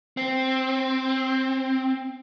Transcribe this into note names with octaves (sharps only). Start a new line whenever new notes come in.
C4